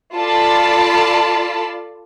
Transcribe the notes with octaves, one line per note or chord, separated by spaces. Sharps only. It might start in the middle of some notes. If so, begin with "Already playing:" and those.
F4 A4 D5 A5 B5